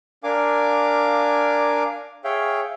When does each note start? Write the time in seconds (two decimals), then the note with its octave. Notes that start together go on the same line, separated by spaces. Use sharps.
0.24 D4 A#4 F5 G#5 D6
2.24 G#4 C#5 E5 F5 G5